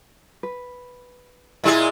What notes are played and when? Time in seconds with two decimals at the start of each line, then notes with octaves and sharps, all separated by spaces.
0.43 B4
1.64 A#2 G#3 E4 G#4 E5